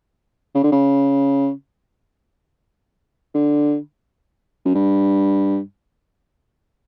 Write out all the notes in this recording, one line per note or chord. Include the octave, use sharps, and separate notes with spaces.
C#3
D3
C#3
D3
F#2
G2